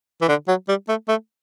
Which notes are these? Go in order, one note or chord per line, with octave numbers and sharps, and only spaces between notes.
E3
D3
F#3
G3
A3
A3